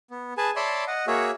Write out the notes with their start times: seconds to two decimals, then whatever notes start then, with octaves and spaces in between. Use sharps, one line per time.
0.11 B3
0.38 G#4 B4 G#5 A5
0.56 C#5 D5 E5 A5 B5 C6
0.87 D#5 F#5
1.07 A#3 F#4 G#4 C#5 E5